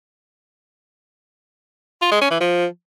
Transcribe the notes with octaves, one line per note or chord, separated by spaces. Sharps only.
F4
G#3
C#4
E3
F3